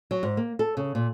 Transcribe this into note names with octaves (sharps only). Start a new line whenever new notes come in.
F#3
G#2
A#3
A4
C#3
A#2